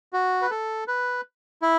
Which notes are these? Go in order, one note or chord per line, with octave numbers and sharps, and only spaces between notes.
F#4
B4
A4
B4
E4